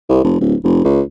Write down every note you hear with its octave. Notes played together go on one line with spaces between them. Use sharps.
C2
F1
D1
F1
C#2